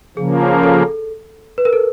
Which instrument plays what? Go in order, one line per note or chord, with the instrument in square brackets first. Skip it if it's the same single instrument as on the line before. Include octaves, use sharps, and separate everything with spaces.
[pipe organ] C#3 F3 A#3 [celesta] G#4
[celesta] A4
B4
A#4
A4